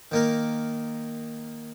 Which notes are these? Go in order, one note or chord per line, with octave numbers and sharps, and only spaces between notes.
D#3 A#3 A#4